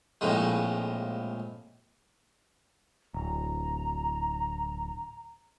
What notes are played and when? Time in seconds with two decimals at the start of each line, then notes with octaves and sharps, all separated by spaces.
0.21 A#1 F2 A2 G#3
3.14 D1 A#5